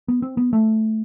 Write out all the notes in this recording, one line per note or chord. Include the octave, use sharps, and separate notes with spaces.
B3
C4
B3
A3